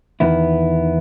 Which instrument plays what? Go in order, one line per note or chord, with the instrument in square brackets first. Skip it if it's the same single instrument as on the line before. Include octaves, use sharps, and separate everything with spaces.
[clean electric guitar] E2 D#3 B3 E4